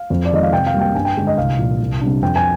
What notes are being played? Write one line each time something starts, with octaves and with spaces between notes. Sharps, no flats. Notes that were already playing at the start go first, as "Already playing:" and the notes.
Already playing: F5
F2
D5
D#3 G#3 D#5
F5
C3 G5
F5
G3 A#3
G5
G2 G#5
G5
D3 G#3 D4
D#5
C2 F5
A#2 F3
C2
C3 G3 D4
F2 G5
G#5